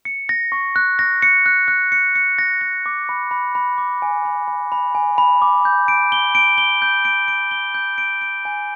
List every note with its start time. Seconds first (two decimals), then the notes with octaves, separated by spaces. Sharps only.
0.05 C#7
0.29 A#6
0.52 C#6
0.76 F#6
0.99 A#6
1.22 C#7
1.46 F#6
1.68 F#6
1.92 C#7
2.15 C#7
2.39 A#6
2.61 A#6
2.86 D6
3.09 B5
3.31 B5
3.55 B5
3.78 D6
4.02 G#5
4.25 B5
4.48 B5
4.72 B5
4.95 G#5
5.18 B5
5.42 D6
5.65 G6
5.88 D7
6.12 G7
6.35 D7
6.58 G7
6.82 G6
7.05 D7
7.28 D7
7.51 G7
7.75 G6
7.98 D7
8.22 D7
8.45 G#5